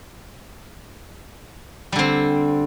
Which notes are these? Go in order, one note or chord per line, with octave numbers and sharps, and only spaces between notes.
D3 G3 C4